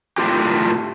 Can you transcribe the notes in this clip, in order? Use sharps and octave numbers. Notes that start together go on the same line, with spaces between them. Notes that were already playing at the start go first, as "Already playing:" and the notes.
A2 A3 F4 G4